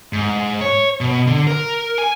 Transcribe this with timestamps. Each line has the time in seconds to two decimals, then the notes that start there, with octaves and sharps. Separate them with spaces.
0.13 G#2
0.61 C#5
1.01 B2
1.27 D3
1.47 A#4
1.98 G#5